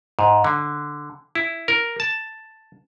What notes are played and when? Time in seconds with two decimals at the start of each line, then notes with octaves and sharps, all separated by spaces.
0.19 G#2
0.44 D3
1.35 E4
1.68 A#4
2.00 A5